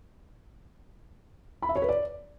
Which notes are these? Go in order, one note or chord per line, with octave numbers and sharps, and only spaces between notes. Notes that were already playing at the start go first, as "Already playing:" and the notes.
B5
E5
C#5
B4
D5